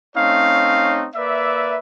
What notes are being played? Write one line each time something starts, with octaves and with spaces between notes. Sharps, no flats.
A3 C4 C#4 D#4 C#5 F5
A#3 B4 D5 E5